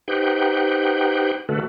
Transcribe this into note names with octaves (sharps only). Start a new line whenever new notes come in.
D#4 G4 B4 C5 F#5 G5
D3 A3 F#4 A4 B4